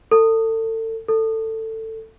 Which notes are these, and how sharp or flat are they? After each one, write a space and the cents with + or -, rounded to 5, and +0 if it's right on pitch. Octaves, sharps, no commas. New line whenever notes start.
A4 +30
A4 +15